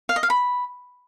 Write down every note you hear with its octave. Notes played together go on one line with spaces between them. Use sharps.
F5
D#5
F5
B5